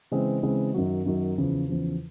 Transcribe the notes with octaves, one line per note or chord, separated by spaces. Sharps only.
C#3 E3 G#3 C4
C#3 E3 G#3 C4
F#2 D#3 F#3
F#2 D#3 F#3
E2 C#3 F3
E2 C#3 F3